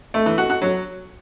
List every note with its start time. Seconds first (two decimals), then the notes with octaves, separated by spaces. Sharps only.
0.14 A3
0.26 E3
0.38 F#4
0.50 F#4
0.62 F#3